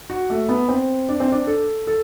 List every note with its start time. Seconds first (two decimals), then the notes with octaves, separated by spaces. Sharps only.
0.10 F#4
0.30 A3
0.49 B3
0.68 C4
1.09 D4
1.20 C4
1.32 D4
1.47 A4
1.87 A4